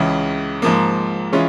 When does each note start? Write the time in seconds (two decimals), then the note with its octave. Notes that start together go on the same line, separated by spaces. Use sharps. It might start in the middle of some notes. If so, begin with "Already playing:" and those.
Already playing: C#2 C#3 E3
0.62 G#2 F3 A#3
1.33 E3 G#3 C#4 F4